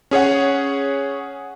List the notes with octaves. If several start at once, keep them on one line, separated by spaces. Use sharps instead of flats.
C#4 G#4 C#5 F#5